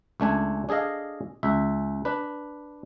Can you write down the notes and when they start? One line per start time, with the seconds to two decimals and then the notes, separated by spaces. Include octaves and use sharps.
0.20 C#2 A3 D4 G#5
0.69 D4 G#4 A4 D#5 F5
1.43 C#2 E5
2.05 D4 B4